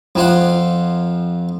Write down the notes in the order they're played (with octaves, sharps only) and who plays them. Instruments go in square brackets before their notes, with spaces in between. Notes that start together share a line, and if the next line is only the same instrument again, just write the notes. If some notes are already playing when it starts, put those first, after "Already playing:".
[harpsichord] F2 F3 F4 F#5